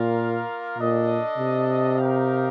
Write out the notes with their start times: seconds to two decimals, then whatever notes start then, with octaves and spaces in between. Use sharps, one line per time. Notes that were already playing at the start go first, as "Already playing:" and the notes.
Already playing: A#2 A#3 F4 A#4 F5
0.78 A#2 D4 A4 D#5
1.38 C3
1.98 D#4 G4 A#4 F5